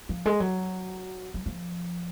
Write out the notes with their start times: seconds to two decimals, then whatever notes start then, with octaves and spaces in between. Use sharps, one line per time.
0.09 F3
0.26 G#3
0.40 F#3
1.34 F#3
1.46 F3